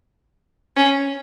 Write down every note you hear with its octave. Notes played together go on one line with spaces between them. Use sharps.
C#4